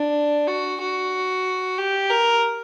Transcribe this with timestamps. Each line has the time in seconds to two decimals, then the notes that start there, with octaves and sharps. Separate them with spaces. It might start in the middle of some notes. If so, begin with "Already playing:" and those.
Already playing: D4
0.47 F#4
0.81 F#4
1.78 G4
2.10 A#4